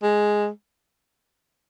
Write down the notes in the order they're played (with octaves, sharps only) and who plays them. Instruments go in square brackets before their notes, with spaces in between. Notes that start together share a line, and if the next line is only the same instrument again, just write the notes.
[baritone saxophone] G#3